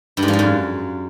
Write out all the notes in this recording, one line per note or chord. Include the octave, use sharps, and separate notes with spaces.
G2
G#2
F3
G#2
F#2